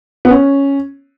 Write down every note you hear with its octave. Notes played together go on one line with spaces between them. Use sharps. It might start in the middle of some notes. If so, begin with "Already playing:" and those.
B3
C#4